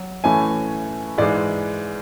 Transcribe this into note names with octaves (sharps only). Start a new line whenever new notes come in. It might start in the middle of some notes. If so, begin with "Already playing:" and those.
Already playing: F#3
A2 E3 A3 C#4 G#5
G#2 E3 G#3 D5